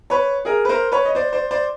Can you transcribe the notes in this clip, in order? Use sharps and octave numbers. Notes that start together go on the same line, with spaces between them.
B4 C#5
G#4 A#4
B4
A#4 C5
B4 C#5
D#5
C5 D5
C5 D5
C5 D5